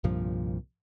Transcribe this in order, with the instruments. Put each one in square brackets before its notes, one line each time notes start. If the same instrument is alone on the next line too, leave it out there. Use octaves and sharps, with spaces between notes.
[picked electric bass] C2 G2 A#2 F3